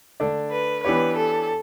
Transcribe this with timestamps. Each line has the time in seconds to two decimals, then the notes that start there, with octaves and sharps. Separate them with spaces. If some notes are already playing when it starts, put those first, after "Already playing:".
0.20 D3 A3 D4 A4 D5
0.52 B4
0.84 E3 B3 D4 G4 B4 C#5
1.17 A4